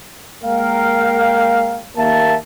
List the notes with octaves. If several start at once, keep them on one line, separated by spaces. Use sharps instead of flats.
G#3 A#3 A#4 F5 G5
D#2 A#3 E5 A5